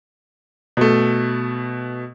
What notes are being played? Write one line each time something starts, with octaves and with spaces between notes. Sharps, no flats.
B2 A3